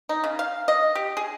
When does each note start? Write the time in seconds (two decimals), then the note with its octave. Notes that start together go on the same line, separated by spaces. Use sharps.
0.09 D#4
0.24 C#3
0.39 F5
0.68 D#5
0.95 G4
1.17 G#4